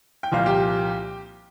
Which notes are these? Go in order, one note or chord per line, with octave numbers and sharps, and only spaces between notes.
G5
C2 A#2 F3 F5
G4 G5